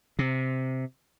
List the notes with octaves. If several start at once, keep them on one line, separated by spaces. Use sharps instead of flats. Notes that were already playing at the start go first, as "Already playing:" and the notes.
C3